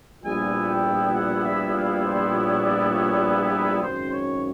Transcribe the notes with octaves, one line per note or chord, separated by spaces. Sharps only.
A#1 A#2 G3 B3 E4 G#5
G5
F#5
E5
F5
C5
C#5
D5
C#5
B4
B4
G#1 F#2 C#3 C5
C#5